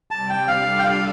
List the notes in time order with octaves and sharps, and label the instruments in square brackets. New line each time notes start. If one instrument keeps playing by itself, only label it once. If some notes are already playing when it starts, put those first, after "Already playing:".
[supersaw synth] C3 G3 C4 G4 D5 [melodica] A5
[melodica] G5
[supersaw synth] G3 D4 F4 A4 D5 [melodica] F5
[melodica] G5
F5